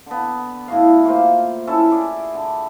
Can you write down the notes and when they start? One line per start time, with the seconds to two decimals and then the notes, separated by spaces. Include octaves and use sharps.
0.06 D3 B3
0.68 A2 F#4 F5
1.06 A#3 F4 C5
1.67 C#4 E4 A4 E5
1.91 G#4 D5
2.34 D3